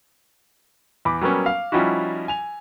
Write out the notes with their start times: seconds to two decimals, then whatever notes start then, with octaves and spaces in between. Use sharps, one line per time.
1.05 E2 B5 D6
1.21 F#3 G3 A#3 B3 C#4
1.46 F5
1.72 F3 G3 C#4 D#4 E4 F#4
2.28 G#5 F7